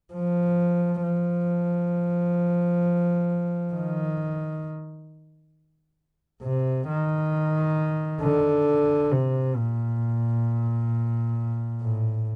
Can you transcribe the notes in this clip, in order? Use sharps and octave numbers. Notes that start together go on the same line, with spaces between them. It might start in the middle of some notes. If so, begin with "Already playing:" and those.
F3
F3
D#3
C3
D#3
D3
C3
A#2
A2